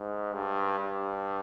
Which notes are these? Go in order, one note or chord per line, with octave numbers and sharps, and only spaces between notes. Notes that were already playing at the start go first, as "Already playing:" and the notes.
Already playing: G#2
G2
G2